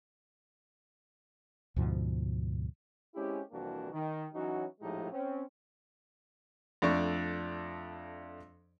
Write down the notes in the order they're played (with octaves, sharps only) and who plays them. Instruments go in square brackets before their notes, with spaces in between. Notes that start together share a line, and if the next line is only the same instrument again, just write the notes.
[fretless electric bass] D2 G#2 B2 F3
[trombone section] G#3 C4 C#4 E4 G4
C2 F2 E3 A#3 D4 F#4
D#3
E3 F#3 C#4 D#4 F#4
A#1 A2 F3 G#3 D#4 G4
C4 C#4
[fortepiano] F2 A3 D4 D5 C#6